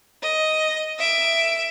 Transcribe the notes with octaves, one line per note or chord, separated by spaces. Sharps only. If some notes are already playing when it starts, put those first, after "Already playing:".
D#5
E5 D7